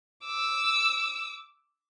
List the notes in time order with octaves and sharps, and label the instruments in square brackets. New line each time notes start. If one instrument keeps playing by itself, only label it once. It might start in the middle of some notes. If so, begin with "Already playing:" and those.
[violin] D6 E6